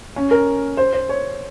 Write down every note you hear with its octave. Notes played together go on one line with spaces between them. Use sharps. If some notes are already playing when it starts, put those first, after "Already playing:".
C#4
A#4
C5
C5
C#5